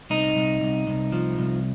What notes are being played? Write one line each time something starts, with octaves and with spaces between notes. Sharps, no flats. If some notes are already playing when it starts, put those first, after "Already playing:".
C2 D#4
C2
C2
C2
F3
C2